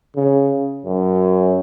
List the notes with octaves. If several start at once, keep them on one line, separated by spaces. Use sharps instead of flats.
C#3
F#2